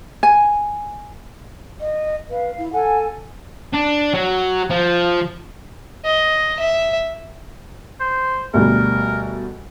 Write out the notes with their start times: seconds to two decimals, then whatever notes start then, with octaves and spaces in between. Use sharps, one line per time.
0.23 G#5
1.80 D#5
2.30 B4 F5
2.58 E4
2.73 A4 F#5 G#5
3.73 D4
4.14 F#3
4.71 F3
6.05 D#5
6.60 E5
8.00 C5
8.54 D2 B2 G3 A#4